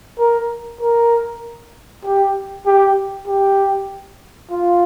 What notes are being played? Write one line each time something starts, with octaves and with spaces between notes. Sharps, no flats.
A#4
A#4
G4
G4
G4
F4